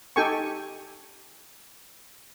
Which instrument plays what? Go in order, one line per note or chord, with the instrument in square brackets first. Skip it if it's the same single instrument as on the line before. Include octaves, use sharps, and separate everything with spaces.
[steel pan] D#4 G4 A4 G5 G#5 C#6